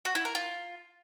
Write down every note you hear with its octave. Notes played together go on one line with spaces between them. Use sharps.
F#4
E4
A#4
F4